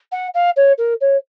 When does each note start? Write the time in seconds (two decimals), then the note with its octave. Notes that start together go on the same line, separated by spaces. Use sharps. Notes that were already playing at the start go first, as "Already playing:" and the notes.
0.11 F#5
0.34 F5
0.56 C#5
0.78 A#4
1.00 C#5